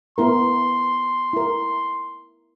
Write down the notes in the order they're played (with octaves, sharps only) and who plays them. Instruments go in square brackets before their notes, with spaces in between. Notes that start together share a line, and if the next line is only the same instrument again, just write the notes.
[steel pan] B3 E4 A#4 [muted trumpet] C6
[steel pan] E4 A#4